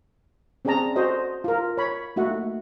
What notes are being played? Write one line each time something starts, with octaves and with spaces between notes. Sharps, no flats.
C4 C#4 G#4 D5 A5 A#5
F#4 A4 C5 D5 D#5
F4 A#4
C#5 B5
A3 A#3 D#4 F#4 E5 F#5